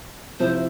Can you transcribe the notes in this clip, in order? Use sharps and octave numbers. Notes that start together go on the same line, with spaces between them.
C3 F3 C4 E4 C5